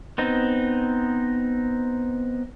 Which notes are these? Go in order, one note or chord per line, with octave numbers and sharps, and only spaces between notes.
B3 C4 D#4